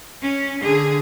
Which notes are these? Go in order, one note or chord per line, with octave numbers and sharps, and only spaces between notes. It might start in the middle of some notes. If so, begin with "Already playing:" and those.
C#4
D3 G#4